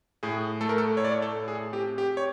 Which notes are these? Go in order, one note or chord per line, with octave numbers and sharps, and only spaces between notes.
A2 G#4
A3 A4
A#4
A4
A2 C#5
D5
C#5
A4
A2
G#4
C4 G4
G4
C#5